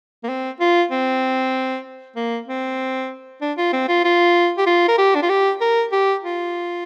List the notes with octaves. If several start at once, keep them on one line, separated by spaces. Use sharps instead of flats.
A#3
C4
F4
C4
A#3
C4
D4
F4
C4
F4
F4
G4
F4
A#4
G4
D4
F4
G4
A#4
G4
F4